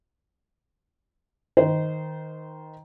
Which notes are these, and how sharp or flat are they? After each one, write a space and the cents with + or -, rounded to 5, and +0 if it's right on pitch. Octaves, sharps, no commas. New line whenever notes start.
D#3 +10 C5 -20